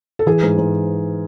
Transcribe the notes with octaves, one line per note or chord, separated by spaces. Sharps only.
A4
E3 G#4
G#2
G#2